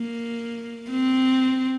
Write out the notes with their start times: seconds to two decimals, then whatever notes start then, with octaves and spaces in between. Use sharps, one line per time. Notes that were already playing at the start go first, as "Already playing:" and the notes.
Already playing: A#3
0.90 C4